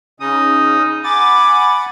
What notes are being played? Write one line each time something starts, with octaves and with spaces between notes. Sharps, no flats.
C#3 C#4 D#4 D#6
F#5 G#5 B5 D6 A6